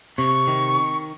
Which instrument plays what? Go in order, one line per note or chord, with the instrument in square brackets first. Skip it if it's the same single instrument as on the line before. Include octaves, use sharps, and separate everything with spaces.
[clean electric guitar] C3 [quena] C#6
[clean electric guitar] D#3